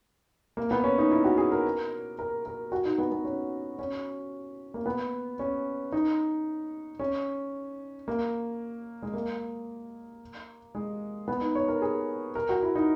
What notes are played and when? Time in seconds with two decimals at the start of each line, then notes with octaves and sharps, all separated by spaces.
0.57 A#3
0.71 B3
0.84 C#4
0.98 D#4
1.11 E4
1.24 F#4
1.37 G#4
1.52 A#4
2.19 A#4
2.45 A#4
2.72 F#4
2.85 D#4
2.98 B3
3.12 B3
3.25 C#4
3.79 C#4
4.74 A#3
4.86 B3
5.39 C#4
5.92 D#4
6.99 C#4
8.08 A#3
9.02 G#3
9.14 A#3
10.75 G#3
11.28 B3
11.41 D#4
11.55 C#5
11.68 A#4
11.82 G#4
12.35 A#4
12.49 F#4
12.63 E4
12.75 D#4